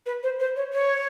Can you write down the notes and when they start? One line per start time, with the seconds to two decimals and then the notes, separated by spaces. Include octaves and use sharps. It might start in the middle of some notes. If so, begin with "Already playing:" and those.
0.06 B4
0.23 C5
0.40 C5
0.56 C#5
0.73 C#5